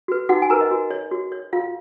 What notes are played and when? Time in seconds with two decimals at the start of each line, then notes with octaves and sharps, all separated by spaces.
0.08 F#4 B4
0.29 D#4 F#4 F#5
0.42 G#5
0.50 F#4 A#4 B4 A#5
0.61 D#5
0.71 F#4
0.91 C#5
1.12 F#4
1.32 C#5
1.53 F4 F#4 F5